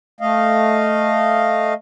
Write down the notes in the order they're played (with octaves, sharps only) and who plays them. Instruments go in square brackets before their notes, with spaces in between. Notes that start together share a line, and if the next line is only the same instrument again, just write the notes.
[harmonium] A3 D#5 F5